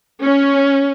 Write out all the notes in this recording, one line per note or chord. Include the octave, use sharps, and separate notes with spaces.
C#4